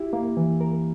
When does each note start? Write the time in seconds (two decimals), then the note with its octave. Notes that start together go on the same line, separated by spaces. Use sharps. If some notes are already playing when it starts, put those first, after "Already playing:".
Already playing: E4 G4
0.13 A#3
0.37 E3
0.61 A#4